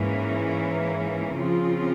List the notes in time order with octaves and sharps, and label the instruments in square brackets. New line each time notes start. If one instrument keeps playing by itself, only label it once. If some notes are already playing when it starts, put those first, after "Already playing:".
Already playing: [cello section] G#2 E3 A#3 C#4
C#3 F3 C4 F4